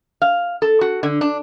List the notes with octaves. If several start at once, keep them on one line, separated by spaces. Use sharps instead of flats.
F5
A4
F#4
D3
D4